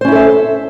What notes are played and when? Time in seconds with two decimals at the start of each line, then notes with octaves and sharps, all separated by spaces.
0.01 C5
0.05 C#4
0.08 E4
0.12 A4
0.16 E5